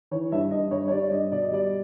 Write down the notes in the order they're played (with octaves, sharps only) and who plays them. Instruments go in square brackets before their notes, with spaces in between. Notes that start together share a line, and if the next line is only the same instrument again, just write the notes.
[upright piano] E3 C#5
G2 E5
G2 D#5
G2 C#5
C#5
G3 D5
D5
G2 D#5
B2 D5
D#5
G3 D5